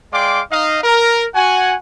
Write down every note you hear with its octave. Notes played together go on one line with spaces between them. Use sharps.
G#3 D5 F5 G5 C6 D6
D#4 D#5 F5
A#4
F#4 F#5 G#5